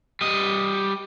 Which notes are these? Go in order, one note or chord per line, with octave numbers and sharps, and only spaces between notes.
G3 D#5